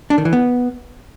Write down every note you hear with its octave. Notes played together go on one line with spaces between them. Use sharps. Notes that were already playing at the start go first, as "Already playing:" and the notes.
D4
D#3
E3
B3